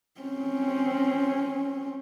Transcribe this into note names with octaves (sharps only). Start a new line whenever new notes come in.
C4 C#4